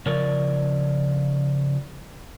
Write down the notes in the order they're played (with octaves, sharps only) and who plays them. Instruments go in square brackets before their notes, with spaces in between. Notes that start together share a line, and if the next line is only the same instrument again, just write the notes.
[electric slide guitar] C#3 F3 A#4 C#5 D5